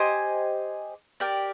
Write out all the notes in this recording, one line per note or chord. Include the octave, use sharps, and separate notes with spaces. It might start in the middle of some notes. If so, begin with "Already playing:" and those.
Already playing: G4 C5 D#5 G#5
G4 A#4 D5 G5